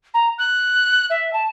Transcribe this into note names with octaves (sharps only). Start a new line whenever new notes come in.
A#5
F#6
E5
A5